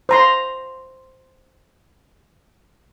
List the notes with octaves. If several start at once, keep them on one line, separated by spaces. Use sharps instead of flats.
C5 A#5 C6